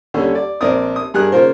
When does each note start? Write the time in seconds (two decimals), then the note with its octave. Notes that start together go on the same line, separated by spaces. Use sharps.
0.14 D#2 D3 G3 C#4
0.35 D5
0.61 A#1 C4 A#4 D5 D#6
0.96 D#6
1.14 G2 G#4 A#4 F#6
1.32 C#3 A#3 F4 A#4 C5